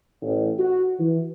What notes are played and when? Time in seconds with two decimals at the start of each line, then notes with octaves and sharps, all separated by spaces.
0.22 A1
0.59 F#4
0.99 E3